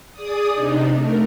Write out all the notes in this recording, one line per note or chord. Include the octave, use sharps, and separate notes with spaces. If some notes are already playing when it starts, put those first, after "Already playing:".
G#4 D5 D#6
C3 D4 D#4
A3 A#4